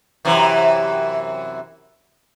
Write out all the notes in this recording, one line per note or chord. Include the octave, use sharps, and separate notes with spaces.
F#2 C3 E3